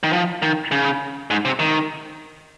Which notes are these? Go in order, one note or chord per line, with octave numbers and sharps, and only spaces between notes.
D#3
F3
D#3
C#3
G#2
C3
D#3